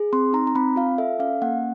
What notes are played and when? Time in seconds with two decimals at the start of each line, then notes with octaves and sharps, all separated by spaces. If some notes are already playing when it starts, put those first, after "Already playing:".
Already playing: G#4
0.13 C4 C6
0.33 D#4 A#5
0.47 A#5
0.55 C4 B5
0.76 F4 F5
0.98 A4 E5
1.19 C#4 F5
1.42 A#3 F#5